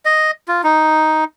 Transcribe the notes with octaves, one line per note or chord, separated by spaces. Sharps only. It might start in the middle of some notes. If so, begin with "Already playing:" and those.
D#5
F4
D#4